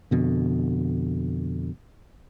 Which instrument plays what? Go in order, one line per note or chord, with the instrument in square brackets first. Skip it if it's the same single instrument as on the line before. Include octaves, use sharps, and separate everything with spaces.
[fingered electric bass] F2 B2 D3